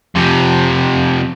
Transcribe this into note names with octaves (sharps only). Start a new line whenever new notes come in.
F2 C3